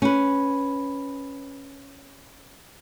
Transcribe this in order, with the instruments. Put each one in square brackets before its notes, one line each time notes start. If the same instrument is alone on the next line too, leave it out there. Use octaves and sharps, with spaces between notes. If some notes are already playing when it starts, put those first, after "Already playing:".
[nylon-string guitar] C#4 B4